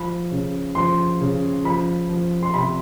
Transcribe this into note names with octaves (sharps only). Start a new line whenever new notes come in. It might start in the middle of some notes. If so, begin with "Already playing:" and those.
Already playing: F3 B5
C#3
F3 C6
C#3
F3 B5
F3
C6
C3 B5